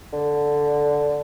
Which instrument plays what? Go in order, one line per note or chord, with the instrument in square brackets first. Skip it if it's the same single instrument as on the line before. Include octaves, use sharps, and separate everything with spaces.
[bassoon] D3